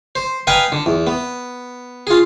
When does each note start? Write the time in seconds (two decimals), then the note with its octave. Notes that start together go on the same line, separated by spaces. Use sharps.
0.15 C5
0.47 B4 D#5 F5 G5 G#5 A#5
0.72 D3
0.86 E2
1.07 B3
2.07 F4 G#4